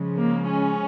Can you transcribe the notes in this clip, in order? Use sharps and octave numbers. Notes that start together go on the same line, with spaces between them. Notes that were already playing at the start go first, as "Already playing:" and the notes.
Already playing: C#3 F3 G#3
A#3
C#4